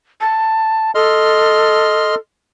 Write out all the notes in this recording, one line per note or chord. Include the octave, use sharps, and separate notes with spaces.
A5
A4 D#5 C6 F6